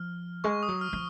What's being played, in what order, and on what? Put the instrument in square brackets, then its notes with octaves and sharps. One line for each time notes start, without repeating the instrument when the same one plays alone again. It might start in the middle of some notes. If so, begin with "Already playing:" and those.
Already playing: [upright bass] F3 [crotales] F6
[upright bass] G#3 [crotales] C#6
[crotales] D#6
[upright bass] F#3
[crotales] F6
[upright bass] F3